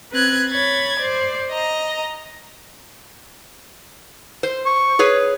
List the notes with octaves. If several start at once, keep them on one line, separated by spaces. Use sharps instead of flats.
C4 B4 F#6 G#6
C#5 B5 G#6 A6
C5 D5
D#5 A#5
C5
C#6
G#4 B4 C#5